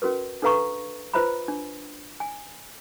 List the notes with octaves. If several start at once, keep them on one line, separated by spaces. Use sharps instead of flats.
C#4 F#4 A#4 B4
D4 A4 B4 F5 A#5 C#6
F4 B4 C5 E5 A#5 B5
D4
G#5